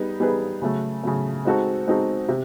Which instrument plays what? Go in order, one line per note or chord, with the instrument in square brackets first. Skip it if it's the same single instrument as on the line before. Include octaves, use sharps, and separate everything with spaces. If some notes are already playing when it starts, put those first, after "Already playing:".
Already playing: [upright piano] G3 B3 D#4 G#4 B4
G3 B3 D#4 G#4 B4
C#3 F#3 A3
C#3 F#3 A3
G#3 C4 D#4 F#4 A4
G#3 C4 D#4 F#4 A4
C3